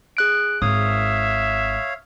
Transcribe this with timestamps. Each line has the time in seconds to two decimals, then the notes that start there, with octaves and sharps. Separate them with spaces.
0.17 G#4 F#6 D7
0.62 G#1 C#5 E5 F5 D#6